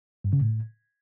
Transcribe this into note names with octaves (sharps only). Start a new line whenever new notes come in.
G2
C#3
A2